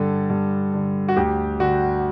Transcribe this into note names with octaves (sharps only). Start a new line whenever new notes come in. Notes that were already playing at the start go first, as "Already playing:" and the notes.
Already playing: G2 D3 A4
G2
D3
F#4
D2 G4
D3 F#4